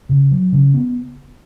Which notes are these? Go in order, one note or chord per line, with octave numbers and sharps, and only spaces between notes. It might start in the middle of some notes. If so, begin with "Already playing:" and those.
C#3
F#3
C#3
B3